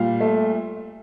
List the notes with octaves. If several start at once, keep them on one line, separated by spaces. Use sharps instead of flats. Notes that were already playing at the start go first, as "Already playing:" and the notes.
Already playing: A#2 G3 F5
A3